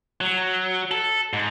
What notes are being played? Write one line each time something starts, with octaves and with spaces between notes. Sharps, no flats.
F#3
A4
G#2